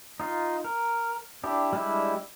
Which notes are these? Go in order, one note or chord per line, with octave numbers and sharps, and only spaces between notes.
D#4 F4
A#4
D4 E4 G4
G3 G#3 D4 E4 G4